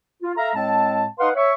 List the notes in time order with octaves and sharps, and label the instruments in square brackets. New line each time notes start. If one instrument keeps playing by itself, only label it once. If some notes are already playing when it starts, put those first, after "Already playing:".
[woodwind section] F4
A4 E5 F5 A#5
A2 G#3 C4 A5
D#4 B4 D#5 F5 F#5 C6
C#5 E5 C#6